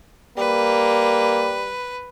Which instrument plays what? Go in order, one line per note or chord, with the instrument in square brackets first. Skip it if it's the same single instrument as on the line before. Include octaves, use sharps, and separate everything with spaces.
[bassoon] G3 [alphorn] A#3 [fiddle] B4